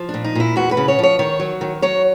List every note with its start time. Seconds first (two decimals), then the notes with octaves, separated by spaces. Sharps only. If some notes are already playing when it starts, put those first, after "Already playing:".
Already playing: F3
0.09 D4
0.14 A#2
0.24 D#4
0.35 A#2 E4
0.56 E2 F#4
0.71 B4
0.77 C#3
0.88 C#5
0.99 F3 C#5
1.19 D#3 C#5
1.40 F#3
1.61 D#3
1.82 F#3 C#5